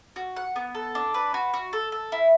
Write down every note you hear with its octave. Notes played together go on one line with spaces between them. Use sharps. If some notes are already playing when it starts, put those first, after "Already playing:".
F#4
F#5
B3
A4
D4
B4
F#4
F#4
A4
A4
E4